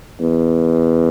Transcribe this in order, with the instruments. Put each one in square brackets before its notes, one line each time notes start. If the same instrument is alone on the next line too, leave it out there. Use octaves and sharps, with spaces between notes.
[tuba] E2